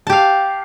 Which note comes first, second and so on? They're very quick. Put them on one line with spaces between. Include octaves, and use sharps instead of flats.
A5 G4 F5